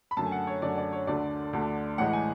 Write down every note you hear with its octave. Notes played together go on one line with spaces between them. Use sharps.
B5
F#2 D3 A3 A5
G#5
F#5
C#5
F#2 D3 A3 D5
D5
C#5
D2 D3 A3 D5
D2 D3 A3
A1 A2 E3 G#3 F#5
G#5